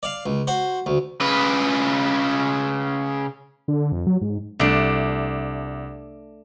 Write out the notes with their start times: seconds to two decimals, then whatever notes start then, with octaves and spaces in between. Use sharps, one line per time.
0.03 D5 F5
0.26 C#2
0.47 F#4 C5
0.86 D2
1.21 C#3 B4
3.68 D3
3.92 F2
4.07 F#3
4.22 G#2
4.60 C2 A3 D4